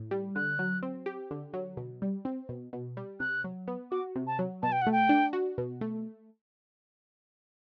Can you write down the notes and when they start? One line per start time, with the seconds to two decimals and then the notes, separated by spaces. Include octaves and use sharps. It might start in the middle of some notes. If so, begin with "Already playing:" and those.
Already playing: A2
0.11 G3
0.35 D3 F#6
0.59 F#3
0.83 C4
1.06 G4
1.31 D3
1.53 F#3
1.77 B2
2.02 G3
2.25 C4
2.49 B2
2.73 B2
2.97 G3
3.20 C3 F#6
3.44 F#3
3.68 B3
3.91 F#4 D6
4.16 C3
4.27 A5
4.39 F#3
4.63 B2 A5
4.72 G5
4.82 F#5
4.87 A3
4.92 G5
5.09 D4
5.33 F#4
5.58 B2
5.81 A3